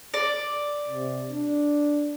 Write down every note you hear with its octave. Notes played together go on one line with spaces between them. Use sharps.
D5
C3
D4